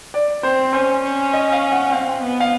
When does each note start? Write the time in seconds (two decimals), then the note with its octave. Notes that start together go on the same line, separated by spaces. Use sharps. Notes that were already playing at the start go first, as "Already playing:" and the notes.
0.14 D5
0.43 C4 C5
0.73 C#4 C5
1.03 C#4
1.33 D#5
1.52 F5
1.72 F#5
1.92 C4 F5
2.22 B3
2.40 F5